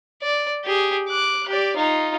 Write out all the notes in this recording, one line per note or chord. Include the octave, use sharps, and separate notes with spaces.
D5
G4 G#4
D6 F#6
G4 D5
D#4 F4